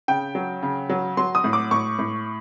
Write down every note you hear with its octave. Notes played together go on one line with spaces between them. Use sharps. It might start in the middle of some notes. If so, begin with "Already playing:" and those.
C#3 G5
F#3
C#3
F#3
F#3 C6
D#6
A2
D6
A2 C#6
A2